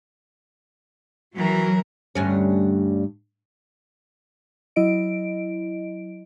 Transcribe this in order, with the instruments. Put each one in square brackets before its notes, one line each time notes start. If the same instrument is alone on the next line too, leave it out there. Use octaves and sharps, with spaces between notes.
[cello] E3 A#4 [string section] F#3
[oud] D2 G2 C#4
[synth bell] F#3 E4 D#5 D7